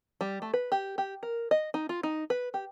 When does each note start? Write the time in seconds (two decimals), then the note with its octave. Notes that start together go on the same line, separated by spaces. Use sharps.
0.21 G3
0.42 A3
0.54 B4
0.72 G4
0.98 G4
1.23 A#4
1.51 D#5
1.74 D#4
1.89 F4
2.03 D#4
2.30 B4
2.54 G4